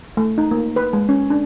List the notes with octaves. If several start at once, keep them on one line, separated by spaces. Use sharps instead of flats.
A3
D#4
A#3
B4
G#3
C#4
D4